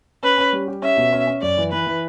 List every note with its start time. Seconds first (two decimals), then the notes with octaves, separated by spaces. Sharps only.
0.23 C#4 B4
0.38 C#4
0.53 G3
0.68 G4
0.82 C#4 E5
0.97 B2
1.13 C#4
1.27 C#4
1.42 F#2 D5
1.58 E3
1.72 E3 B4
1.87 E3